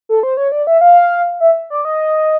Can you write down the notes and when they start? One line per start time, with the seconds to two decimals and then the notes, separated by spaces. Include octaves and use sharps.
0.09 A4
0.23 C5
0.37 C#5
0.52 D5
0.67 E5
0.81 F5
1.40 E5
1.70 D5
1.85 D#5